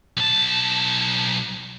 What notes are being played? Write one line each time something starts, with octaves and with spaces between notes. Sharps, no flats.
B1 A5